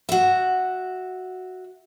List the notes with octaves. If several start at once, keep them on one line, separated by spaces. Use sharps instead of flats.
F#4 E5